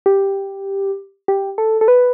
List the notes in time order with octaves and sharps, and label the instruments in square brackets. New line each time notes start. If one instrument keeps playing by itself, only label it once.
[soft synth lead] G4
G4
A4
A4
B4